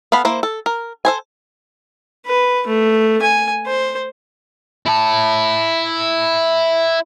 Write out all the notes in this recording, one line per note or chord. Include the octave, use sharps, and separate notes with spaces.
B3 A4 F5 B5
A#3 E4 C5
A4
A#4
A4 C5 G#5
B4
A3
G#5
C5
E4 A5